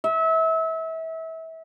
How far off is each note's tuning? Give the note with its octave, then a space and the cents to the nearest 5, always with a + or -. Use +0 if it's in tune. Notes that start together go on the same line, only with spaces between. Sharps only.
E5 -30